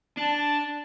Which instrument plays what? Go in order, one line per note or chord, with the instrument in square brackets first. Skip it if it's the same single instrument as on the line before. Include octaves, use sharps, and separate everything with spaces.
[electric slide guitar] D4 [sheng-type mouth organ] A5